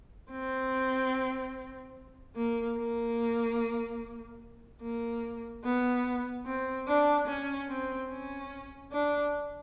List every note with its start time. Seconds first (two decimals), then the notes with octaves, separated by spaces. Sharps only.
0.31 C4
2.36 A#3
2.77 A#3
4.81 A#3
5.64 B3
6.46 C4
6.87 D4
7.28 C#4
7.69 C4
8.10 C#4
8.92 D4